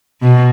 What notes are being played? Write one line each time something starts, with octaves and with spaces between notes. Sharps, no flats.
B2